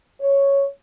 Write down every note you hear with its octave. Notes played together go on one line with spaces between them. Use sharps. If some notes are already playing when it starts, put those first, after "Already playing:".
C#5